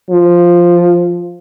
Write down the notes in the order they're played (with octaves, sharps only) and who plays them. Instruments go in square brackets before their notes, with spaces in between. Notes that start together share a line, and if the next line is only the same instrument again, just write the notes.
[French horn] F3